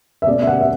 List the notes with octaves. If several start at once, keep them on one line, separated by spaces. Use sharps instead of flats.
E5
B2 A3 C#4 D5
E5
F#5
E5